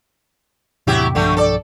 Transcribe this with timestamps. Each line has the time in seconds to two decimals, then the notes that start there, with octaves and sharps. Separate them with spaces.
0.87 E2 A2 C3 F#3 E4 G4
1.15 B1 G2 D3 F3 A3
1.37 A4 D5